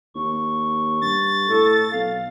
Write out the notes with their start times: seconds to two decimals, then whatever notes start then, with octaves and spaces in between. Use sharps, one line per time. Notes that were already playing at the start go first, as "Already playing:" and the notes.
0.15 D#2 C#6
1.02 G2 A6
1.49 A2 A4
1.93 B1 F5